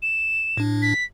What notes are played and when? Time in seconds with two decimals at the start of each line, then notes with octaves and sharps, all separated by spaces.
0.02 E7
0.57 A2 D4
0.82 B6